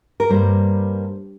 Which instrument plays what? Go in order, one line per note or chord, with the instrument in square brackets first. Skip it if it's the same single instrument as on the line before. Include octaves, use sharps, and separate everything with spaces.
[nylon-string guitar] A#4
G2 G3 A#3 C5